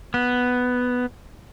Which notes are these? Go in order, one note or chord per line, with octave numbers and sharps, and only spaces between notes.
B3